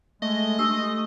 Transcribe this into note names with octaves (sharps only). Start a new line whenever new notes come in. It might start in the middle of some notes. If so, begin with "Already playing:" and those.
G#3 A3 D#5
A3 D4 G4 D#6 E6